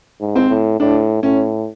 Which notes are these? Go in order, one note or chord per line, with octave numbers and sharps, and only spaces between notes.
G#2
C4
A2
A2 D4
A2 C#4